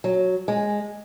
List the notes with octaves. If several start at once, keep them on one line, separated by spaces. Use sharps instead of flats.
F#3
G#3